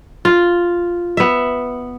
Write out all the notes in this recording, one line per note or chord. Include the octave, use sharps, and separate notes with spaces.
F4
B3 E5